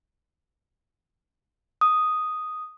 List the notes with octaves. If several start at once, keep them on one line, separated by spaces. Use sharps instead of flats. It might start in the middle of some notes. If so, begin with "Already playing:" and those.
D#6